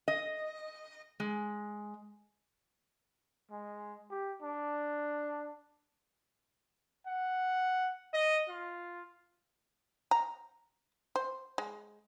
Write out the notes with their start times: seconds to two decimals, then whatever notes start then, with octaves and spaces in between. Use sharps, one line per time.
0.08 D#5
1.20 G#3
3.51 G#3
4.10 G4
4.42 D4
7.07 F#5
8.14 D#5
8.49 F4
10.11 A#5
11.16 C5
11.58 G#3